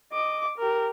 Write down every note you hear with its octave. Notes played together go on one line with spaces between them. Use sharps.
D#5 D6
G4 A#4